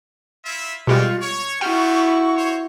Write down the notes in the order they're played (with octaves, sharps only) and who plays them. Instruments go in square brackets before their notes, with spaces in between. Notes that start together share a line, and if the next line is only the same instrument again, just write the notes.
[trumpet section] E4 F4 E5
[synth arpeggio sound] B2 G3 G#3 [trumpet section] C4 G4 C#6 [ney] F4
[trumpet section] C#5 [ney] C#6
[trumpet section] G3 B3 C5 [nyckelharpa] E4 F#4 [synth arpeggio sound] G5 F6
[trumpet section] C5 C#5